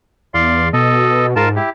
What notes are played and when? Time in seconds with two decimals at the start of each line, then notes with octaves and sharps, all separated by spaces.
0.34 E2 D5 F5 C6
0.73 B2 A4 D#5
1.36 G#2 F4 A#4 A5
1.56 E4 G4